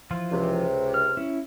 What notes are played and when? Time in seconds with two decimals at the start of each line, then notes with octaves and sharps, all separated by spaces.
0.11 E3 F3 F4
0.32 C#2 C3
0.94 F6
1.17 C#4 E4